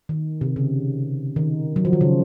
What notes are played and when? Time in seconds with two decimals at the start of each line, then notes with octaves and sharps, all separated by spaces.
0.09 D#3
0.41 C3
0.56 C#3
1.36 D#3
1.76 F#3
1.85 F3
1.93 D#3
2.01 C#3